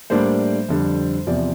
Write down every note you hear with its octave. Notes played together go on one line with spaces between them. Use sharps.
A2 G3 A#3 D4 C5
F2 D3 G3
E2 C3 F3 D5